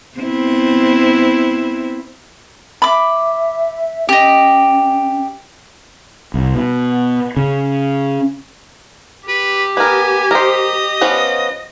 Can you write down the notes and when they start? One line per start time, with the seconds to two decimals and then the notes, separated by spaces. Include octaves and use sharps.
0.18 B3 C4 E4
2.82 E5 B5 D6
4.09 C#4 G4 D#5
6.34 C2
6.55 B2
7.37 C#3
9.28 G4 B4
9.77 B3 A#4 G#5
10.31 A#4 C5 D#5
11.01 F3 B3 C#4